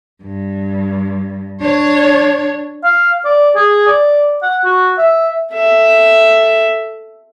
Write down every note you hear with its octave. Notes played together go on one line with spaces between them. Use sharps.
G2
D4 C#5
F5
D5
G#4
D5
F#5
F#4
E5
A4 E5